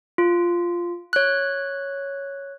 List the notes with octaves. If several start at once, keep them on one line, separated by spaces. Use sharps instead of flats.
F4
C#5 F#6